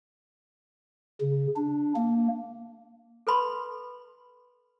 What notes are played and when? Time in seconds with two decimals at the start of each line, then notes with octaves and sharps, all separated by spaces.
1.21 C#3
1.56 D4
1.96 A#3
3.27 A4 B4 B5 C6